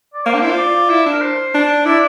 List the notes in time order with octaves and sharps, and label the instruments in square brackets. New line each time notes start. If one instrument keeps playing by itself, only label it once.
[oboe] D5
[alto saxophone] A#3 [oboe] C5
[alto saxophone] D4
[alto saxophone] E4 [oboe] C5
[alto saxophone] F4
[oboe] D5
[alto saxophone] E4
D4
[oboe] A#4
C5
[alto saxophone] D4
[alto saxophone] E4 [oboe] D5